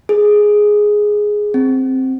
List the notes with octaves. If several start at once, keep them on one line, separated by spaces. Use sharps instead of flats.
G#4
C4